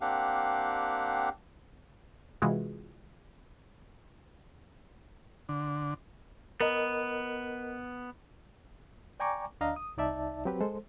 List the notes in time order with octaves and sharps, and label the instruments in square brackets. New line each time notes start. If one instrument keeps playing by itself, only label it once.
[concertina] A#3 C4 D4 G4 F5 F#5
[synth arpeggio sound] C3 E3 G#3 F4 F#4 G#4
[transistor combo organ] D3
[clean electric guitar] B3 [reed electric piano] A#4 D#5
[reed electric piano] D5 G5 G#5 A#5 C#6 D6
D2 D4 D#5 F5 A#5
D#6
C2 D#4 D5 E5 A5
F#3 C4 G4 B4
G#3 A4 C5